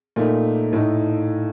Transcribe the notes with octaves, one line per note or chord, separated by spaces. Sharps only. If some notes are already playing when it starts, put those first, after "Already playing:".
A#2 A3 D#4
A2 A3 D#4